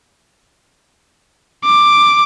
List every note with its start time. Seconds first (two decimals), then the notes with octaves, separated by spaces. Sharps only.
1.64 D6